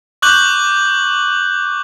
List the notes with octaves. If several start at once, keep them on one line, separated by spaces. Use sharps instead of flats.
C#6 D6 F#6 G6 F#7